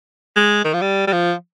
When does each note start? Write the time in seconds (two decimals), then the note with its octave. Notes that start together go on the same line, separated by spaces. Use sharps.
0.36 G#3
0.64 D#3
0.74 F3
0.81 G3
1.07 G3
1.12 F3